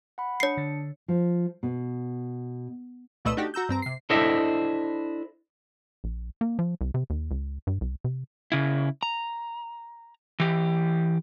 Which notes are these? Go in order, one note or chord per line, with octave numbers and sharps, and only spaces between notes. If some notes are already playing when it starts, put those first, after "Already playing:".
F#5 B5
D4 C#5 C7 C#7
D3
F3
B2
C2 A#2 A3 B4 D#5 E6
A3 D4 D#4 F#4 G4
F#4 A#5 E6 G6
G2 C4 A#5
C3 C7
D4 E4 A4 C5 D#5 E5
A#1
A#3
F3
C2
C3
D#2
C#2
G2
C2
C3
C#3 E4
A#5
E3 G4